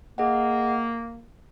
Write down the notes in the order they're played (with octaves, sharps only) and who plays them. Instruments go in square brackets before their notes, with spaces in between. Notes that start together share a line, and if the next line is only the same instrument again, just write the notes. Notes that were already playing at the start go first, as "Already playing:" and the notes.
[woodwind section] A#3 [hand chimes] G#4 D#5 F#5